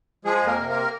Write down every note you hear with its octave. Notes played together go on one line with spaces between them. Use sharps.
F3 G#3 G#4
F2
A#3 A#4
C3
A#3 A#4